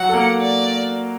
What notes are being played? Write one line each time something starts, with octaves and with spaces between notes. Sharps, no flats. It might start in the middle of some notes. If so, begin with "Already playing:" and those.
Already playing: F#3 F#4 F#5
A4
A#3 A#4
D5